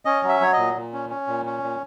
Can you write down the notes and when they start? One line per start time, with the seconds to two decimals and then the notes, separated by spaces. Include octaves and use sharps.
0.05 C#4 D#5
0.23 F#3
0.28 E5
0.41 F#3 C#5
0.53 A#2 D#5
0.75 A#2
0.93 C#4
1.10 C#4
1.27 A#2
1.46 C#4
1.62 A#2